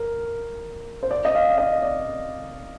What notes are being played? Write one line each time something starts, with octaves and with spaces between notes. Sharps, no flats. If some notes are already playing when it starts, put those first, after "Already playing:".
Already playing: A#4
C5
D5
D#5
F5
D#5
D5